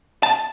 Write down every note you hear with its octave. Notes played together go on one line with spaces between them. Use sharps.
A5